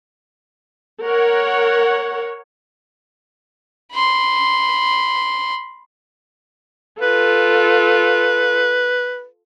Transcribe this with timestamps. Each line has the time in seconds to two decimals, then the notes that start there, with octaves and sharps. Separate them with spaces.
1.04 A#4 C#5 F#5
3.92 B5 C6
7.02 F4 A4 B4